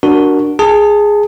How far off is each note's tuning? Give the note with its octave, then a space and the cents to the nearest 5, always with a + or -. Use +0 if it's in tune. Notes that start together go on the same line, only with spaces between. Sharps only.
D4 +0 F#4 +0 A#4 +0
G#4 +0 A5 +25